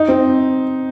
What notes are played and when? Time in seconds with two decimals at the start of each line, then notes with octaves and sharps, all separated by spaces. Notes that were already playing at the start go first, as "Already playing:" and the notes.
Already playing: D#4
0.08 C4